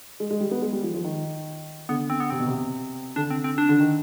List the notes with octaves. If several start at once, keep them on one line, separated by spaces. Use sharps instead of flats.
G#3
G#3
G3
B3
G#3
G3
F3
F3
D#3
D3 B3
C4
B3
C3 C4
B2
C3
D3 D4
C4
C4
D4
D3
D#3